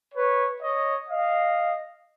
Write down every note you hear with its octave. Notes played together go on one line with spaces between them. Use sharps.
B4 C#5
C#5 D#5
D#5 F5